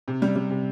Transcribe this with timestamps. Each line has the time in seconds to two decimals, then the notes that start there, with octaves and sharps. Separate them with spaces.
0.08 C3
0.22 G3
0.36 G3
0.50 C3